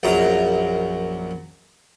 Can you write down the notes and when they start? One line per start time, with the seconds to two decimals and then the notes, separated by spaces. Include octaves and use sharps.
0.03 A#1 F#2 A#5